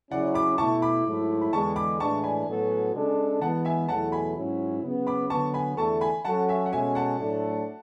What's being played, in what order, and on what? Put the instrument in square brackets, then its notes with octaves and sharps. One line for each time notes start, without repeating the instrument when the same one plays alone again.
[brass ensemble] C#3 F#3 C#4 E4 [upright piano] D5 F#5
[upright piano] B5 D6
[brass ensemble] B2 A3 E4 [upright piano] A5 C#6
[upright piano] B5 D6
[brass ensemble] G#2 F#3 A3 E4
[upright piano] B5
[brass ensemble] E2 D3 G#3 [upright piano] A5 C#6
[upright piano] B5 D6
[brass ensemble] A2 E3 G#3 D4 [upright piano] A5 C#6
[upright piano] G#5 B5
[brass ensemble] A2 F#3 B3 F#4 A4
C#3 G#3 D4 A4
[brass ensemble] E3 G#3 B3 [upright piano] F#5 A5
[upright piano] E5 G#5
[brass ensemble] E2 B2 F#3 A3 E4 [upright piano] F#5 A5
[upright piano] G#5 B5
[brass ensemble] G#2 F#3 C#4 E4
C#3 F#3 B3
[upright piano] B5 D6
[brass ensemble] D3 F#3 B3 [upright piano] A5 C#6
[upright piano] G#5 B5
[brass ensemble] E2 D3 A3 E4 A4 [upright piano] A5 C#6
[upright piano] G#5 B5
[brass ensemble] F#3 C#4 F#4 A4 [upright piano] F#5 A5
[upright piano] E5 G#5
F#5
[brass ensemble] B2 G#3 C#4 F#4 A4 [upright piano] E5 G#5
[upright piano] F#5 A5
[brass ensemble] A2 F#3 A3 D4 A4